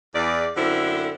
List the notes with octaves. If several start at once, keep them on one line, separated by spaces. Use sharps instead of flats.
E2 D5
F#2 D3 C4 E4 A4